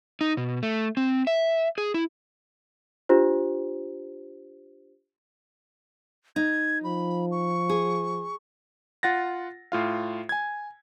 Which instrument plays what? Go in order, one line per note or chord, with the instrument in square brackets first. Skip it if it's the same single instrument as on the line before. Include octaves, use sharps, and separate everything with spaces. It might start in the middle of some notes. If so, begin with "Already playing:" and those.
[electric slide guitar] D#4
B2
A3
C4
E5
G#4
E4
[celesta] D4 F4 G4 C5
[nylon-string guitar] D#4 [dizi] G#6
[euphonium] F3 [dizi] B5
[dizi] C#6
[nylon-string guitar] G#4
[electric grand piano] F4 F#5 A6 A#6
A2 F4 F5
G#5 G#6